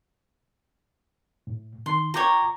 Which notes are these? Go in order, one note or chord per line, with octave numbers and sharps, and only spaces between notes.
A2
D#3 C6
F4 C#5 G5 A#5 D6